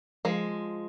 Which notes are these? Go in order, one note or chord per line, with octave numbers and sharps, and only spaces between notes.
F3 G#3